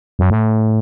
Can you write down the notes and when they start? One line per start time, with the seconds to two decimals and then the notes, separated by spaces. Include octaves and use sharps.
0.19 F#2
0.30 A2